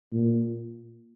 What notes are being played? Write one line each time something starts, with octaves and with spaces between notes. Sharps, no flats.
A#2